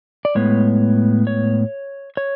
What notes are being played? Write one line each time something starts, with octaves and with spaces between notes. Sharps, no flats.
D5
A2 G#3 B3 C#5
C#5
C#5